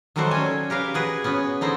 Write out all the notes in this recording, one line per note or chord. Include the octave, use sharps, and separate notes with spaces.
D#3 F#3 G3 A3 F#4 C5
C#4 G#5
G4 A#4 B4 F5
F#4 G#4 B4
B3 C#4 F#4 B4
D3 D#4 E4 C5